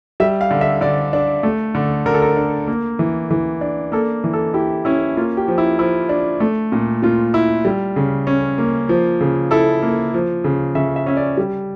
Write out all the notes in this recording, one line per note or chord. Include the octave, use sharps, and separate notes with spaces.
G3 E5
F5
D3
E5
D3 D5
D4
A3
D3
D3 A#4
A4
A#4
D4
A#3
E3
E3
D4
A#3 A4
E3
A4
E4 G4
C#4 E4
A#3 F4
G4
F3
E4
F3 E4
D4
A3
A#2
A#2 F4
E4
G3
C#3
C#4
A#3
F3
C#3
E4 A4
A#3
F3
C#3
C#3 E5
E5
C#4 E5
D5
G3